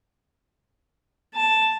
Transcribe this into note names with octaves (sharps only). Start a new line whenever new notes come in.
A5